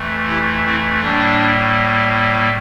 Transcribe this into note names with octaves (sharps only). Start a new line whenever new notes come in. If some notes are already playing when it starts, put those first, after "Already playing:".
Already playing: F2 E3 A3
E4 G4
C4 E4
A2 G3 A#3 D4